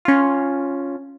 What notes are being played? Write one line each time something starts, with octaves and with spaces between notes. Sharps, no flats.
C#4 F4